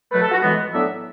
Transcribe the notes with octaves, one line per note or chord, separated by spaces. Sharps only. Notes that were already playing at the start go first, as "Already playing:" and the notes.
B2 F#3 A3 B4
A4
F#4
A2 E3 G#3 B3
A2 F#3 B3 D4 E5